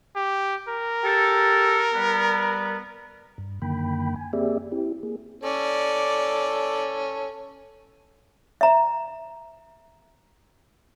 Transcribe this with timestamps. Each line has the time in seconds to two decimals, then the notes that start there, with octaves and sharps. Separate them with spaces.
0.15 G4
0.68 A#4
1.04 G4 A4
1.94 G3 B3
3.38 G2
3.62 F#2 D3 D#3 A#3 G5 B5
4.16 G#5
4.33 A#3 C4 G4 G#4 D5 E5
4.72 C4 E4 G4
5.03 A#3 G#4
5.43 C#4 A4 D5
8.61 E5 A#5